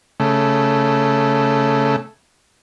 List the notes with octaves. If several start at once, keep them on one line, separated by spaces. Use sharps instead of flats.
C#3 A3